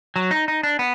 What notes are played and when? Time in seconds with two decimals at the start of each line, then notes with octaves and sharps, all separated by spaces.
0.16 F#3
0.31 D#4
0.48 D#4
0.63 D4
0.79 B3